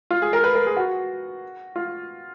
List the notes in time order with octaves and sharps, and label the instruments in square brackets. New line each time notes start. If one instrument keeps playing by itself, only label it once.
[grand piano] F4
G#4
A#4
B4
A#4
G#4
F#4
F4